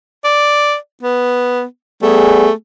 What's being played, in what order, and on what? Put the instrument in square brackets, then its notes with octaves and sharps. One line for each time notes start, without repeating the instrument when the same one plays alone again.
[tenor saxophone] D5
B3
[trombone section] G3 B3 G#4 [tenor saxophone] A3